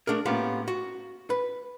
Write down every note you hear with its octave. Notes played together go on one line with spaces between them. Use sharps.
A3 D4 G#4 A#4
A2 A#3 B3 C#4 F4 G4
F#4
B4